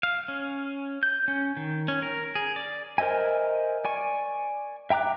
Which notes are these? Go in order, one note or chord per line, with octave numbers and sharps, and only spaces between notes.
F5
C#4
G6
C#4
D#3
C#4
A#4
G#4
D5
A#4 C5 D#5 E5 G#5
D5 G#5 C#6
E5 G5 A#5 D6 F#6